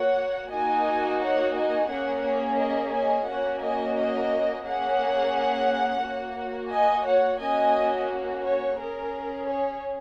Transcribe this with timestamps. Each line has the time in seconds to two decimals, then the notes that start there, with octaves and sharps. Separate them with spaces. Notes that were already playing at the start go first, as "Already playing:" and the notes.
Already playing: A#3 F#4 C#5 F#5
0.52 A#3 D#4 F#4 D#5 G#5
1.21 C#5 F#5
1.55 D#5 G#5
1.90 A#3 C#4 G#4 C#5 F#5
2.25 C#5
2.58 A#4 D#5
2.93 D#5 G#5
3.27 A#3 C#4 F#4 C#5 F#5
3.61 D#5 G#5
3.96 A#4 D#5
4.65 A#3 C#4 G#4 C#5 F#5
6.03 A#3 F#4
6.71 D#5 G#5
7.06 C#5 F#5
7.40 A#3 C#4 F#4 D#5 G#5
8.44 C#5
8.78 C#4 G#4 A#4
9.47 C#5